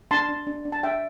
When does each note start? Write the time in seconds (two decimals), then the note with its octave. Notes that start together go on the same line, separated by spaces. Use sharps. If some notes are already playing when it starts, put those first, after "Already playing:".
0.11 D4 A5 C6
0.29 D4
0.47 D4
0.65 D4
0.72 A5
0.83 D4 E5 G5